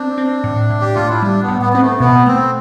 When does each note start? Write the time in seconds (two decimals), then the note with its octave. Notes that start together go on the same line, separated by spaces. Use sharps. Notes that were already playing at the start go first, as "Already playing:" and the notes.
Already playing: C4 D4
0.18 C4
0.44 A2
0.70 A2
0.81 G4
0.95 A2 F4
1.09 E4
1.22 G3 D4
1.42 B3
1.48 A2
1.62 B3
1.73 B3 C4
1.81 A3
2.00 B2 B3
2.26 A3 C4